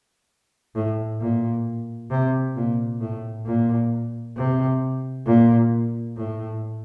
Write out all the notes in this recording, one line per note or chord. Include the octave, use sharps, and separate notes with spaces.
A2
A#2
C3
A#2
A2
A#2
C3
A#2
A2